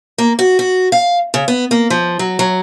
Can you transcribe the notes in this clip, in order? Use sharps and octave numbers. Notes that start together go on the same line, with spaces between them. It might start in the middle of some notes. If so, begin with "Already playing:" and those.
A#3
F#4
F#4
F5
C#3
B3
A#3
F3
F#3
F#3